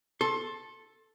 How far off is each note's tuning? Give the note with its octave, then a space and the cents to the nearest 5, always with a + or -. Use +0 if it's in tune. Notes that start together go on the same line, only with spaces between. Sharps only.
A4 +0 C6 +30